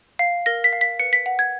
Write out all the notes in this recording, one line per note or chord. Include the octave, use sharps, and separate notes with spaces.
F5
A#4 A#6
B6
F5
B6
B4 C#7
B6
F#5
G#6